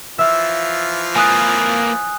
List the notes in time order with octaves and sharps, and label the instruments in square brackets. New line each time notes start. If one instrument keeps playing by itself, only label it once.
[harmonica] E3 F3 F4 [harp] E5 F6
[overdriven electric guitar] A#3 B4 [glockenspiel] G#5 D#6 F#6